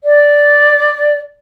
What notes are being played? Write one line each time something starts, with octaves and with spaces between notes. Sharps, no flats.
D5